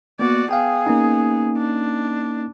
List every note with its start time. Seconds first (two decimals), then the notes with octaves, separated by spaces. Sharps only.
0.19 A#3 B3 F#4 D5
0.51 B3 G#4 F5 G5
0.87 A#3 C#4 D#4
1.58 D4